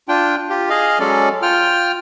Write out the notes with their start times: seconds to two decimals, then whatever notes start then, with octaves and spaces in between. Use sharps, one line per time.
0.08 D4 F4 G5
0.50 F4 G4
0.69 G#4 D#5 F5
1.00 F#3 G#3 C#4 A4 D5
1.42 F4 G5 F6